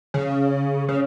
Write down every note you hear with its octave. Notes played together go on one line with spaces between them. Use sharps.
C#3
C#3